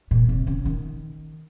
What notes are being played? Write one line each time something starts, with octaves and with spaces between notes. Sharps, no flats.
A#2
C3
C#3
D#3